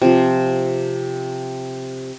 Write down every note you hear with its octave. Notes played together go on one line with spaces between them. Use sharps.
C3 F3